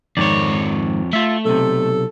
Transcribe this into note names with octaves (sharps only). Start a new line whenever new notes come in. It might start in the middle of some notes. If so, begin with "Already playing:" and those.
F2 G#2 D#3 C#5 D5
A3 F4 E5
B1 C3 A4